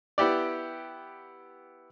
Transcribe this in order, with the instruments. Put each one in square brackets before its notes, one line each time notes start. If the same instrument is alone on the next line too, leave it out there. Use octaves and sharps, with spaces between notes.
[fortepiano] B3 E4 G4 D5